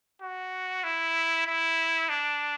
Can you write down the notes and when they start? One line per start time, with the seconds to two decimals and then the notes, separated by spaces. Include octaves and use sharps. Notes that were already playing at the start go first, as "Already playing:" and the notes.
0.22 F#4
0.84 E4
1.47 E4
2.09 D4